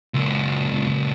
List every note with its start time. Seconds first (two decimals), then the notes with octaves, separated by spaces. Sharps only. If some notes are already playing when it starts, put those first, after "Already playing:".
0.14 C#2 F#2